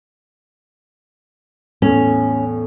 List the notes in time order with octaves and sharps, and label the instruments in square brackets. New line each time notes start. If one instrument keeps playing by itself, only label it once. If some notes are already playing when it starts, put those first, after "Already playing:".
[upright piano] E2 A2 [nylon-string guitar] C#4